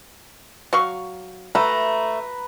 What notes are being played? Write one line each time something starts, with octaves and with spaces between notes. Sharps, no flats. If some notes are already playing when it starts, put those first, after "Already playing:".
F#3 F5 C#6
A3 B4 E5 A#5